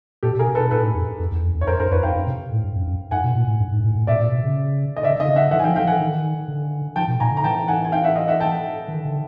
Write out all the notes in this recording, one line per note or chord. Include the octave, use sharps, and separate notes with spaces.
A#2 G4 A4
B2
G#4 A#4
C3
A4 B4
B2
A#2 A4 B4
A2
F2
F2
E2
F2
E2
C#5
F2 A#4 C5
F#2 A#4 C5
F2 B4 C#5
F2 F5 G5
F#2
C3
A2
G2
F#2
F#2
G2 F#5 G#5
B2
A#2
A2
G2
G#2
A2
A2
A#2 D5 E5
A#2
B2
C#3
D#5
C#3 D5 E5
D3
D#5 F5
C#3
E5 F#5
D3
E3 E5 F#5
G#5
F5 G5
F3
F5 G5
E3 F#5 G#5
D#3
D3
F3 G5 A5
B2
A#2 G#5 A#5
D3
A#5
E3 G5 A5
F#5 G#5
G#5
F5 G5
E5 F#5
D#5 F5
E5 F#5
G5 A5
D#3
D3